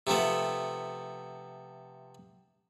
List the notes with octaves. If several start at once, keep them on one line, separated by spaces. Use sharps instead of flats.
C3 F3 A3 B3